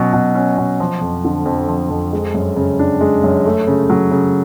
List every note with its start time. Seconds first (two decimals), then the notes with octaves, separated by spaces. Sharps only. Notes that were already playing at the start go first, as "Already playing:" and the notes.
Already playing: B2 F#3 C#4
0.13 B2
0.35 C#4
0.58 B2
0.80 F3
1.01 F2
1.25 D3
1.45 F2
1.69 F3
1.90 F2
2.13 G#3
2.34 F#2
2.56 C#3
2.79 D4
3.01 G#3
3.24 F#2
3.46 A3
3.67 C#3
3.90 F#3
4.11 C#3